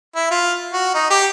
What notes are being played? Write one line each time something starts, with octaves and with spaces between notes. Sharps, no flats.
E4
F4
F#4
D#4
G4